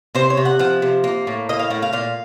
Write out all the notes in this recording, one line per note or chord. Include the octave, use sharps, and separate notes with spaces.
C3 C5
C#5
C3
F#5
F3 F#5
C3
A#3
A2
A#3 D#5
F5
A2 F#5
F5
A#2 F5